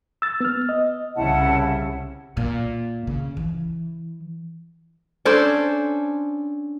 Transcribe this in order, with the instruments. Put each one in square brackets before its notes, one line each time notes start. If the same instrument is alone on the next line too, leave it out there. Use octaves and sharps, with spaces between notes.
[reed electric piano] E6 A6
B3 F6
D#5
[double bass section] C2 C#3 [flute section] E4 F#5 A5
[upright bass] A#2
C#3
E3
[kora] C#4 D4 A4 C5